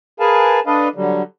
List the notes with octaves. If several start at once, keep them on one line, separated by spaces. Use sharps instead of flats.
G#4 A#4 B4 F5 G#5 A5
D4 A4 B4 D#5 F5
D3 F#3 G3